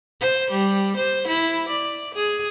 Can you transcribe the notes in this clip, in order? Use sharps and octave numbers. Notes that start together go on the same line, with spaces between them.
C5
G3
C5
E4
D5
G#4